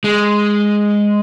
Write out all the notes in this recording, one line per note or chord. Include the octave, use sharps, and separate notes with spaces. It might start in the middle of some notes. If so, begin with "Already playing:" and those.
G#3